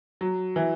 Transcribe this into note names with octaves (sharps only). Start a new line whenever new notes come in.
F#3
E3